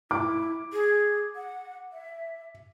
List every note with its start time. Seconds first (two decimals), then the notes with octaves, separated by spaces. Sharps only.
0.11 E4 D6
0.73 G#4
1.35 F#5
1.93 E5